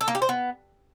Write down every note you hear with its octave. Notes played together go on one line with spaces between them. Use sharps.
A4
A#3
G4
C5
B3